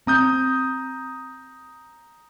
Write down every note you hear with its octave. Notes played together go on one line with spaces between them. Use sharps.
C4 A#5 D#6 G6